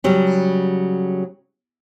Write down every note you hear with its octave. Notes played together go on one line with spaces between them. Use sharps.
C#3 F#3 G3